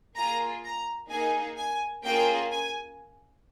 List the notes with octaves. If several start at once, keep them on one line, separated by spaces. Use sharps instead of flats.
A#3 F4 G#4 A#5
A#5
A#3 D#4 G#4 G#5
G#5
A#3 C#4 F4 G#4 G5
G#5